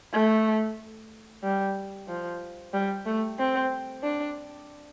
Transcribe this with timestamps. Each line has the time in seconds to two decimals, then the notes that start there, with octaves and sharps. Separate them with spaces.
0.13 A3
1.43 G3
2.08 F3
2.74 G3
3.06 A3
3.39 C4
4.04 D4